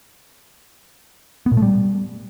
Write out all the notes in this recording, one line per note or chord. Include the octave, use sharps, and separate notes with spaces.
B3
A#2
A3
G3